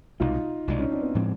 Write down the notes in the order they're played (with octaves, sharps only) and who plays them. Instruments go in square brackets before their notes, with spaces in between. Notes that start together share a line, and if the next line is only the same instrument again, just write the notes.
[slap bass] C2 B2 G#3 [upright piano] D#4 F4
[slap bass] C2 B2 G#3 [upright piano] D4
[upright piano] C#4 D#4
C4 D4
B3 C#4
[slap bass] A2 F3 G#3 C4